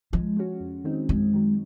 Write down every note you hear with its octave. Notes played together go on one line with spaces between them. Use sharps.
F3 G#3
G#3 C#4 F#4
F2
D#3 G#3 C4 D#4
F#2 G#3
D#3 F#3